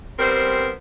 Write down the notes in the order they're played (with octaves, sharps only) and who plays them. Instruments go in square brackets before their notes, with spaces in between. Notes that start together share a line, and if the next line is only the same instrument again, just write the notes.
[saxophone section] G3 B3 C4 A#4 C5